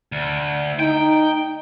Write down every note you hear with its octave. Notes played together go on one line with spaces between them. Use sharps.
D2
D#4 G5